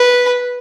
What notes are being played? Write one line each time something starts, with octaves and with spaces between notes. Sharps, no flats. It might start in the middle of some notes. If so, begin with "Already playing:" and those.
Already playing: B4